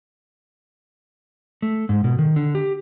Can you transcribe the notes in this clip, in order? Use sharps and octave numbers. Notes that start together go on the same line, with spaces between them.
A3
G#2
B2
D#3
D3
G4